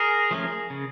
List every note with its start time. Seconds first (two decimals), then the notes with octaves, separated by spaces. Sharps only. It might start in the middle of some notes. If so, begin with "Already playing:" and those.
Already playing: G#4 A#4
0.31 F3 A3 C#4
0.70 C#3